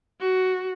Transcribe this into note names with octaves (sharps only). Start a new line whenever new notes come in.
F#4